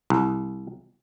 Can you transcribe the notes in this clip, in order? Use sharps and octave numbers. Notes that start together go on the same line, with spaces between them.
C2